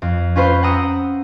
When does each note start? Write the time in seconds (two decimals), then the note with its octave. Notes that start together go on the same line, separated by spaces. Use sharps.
0.02 F2
0.36 C#4 F4 B4 C5
0.63 F#5 G5 A#5 D#6 E6